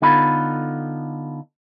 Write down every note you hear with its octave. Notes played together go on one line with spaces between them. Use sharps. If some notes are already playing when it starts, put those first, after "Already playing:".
D3 B3 D#4 F4 A4 B5